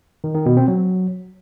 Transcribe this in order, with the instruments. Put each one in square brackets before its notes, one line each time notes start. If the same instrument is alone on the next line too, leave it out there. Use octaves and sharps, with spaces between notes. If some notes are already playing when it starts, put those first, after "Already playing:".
[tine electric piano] D#3
D#3
B2
C4
F#3